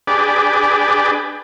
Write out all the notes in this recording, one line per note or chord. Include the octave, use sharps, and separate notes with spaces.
D4 G4 G#4 B4 D5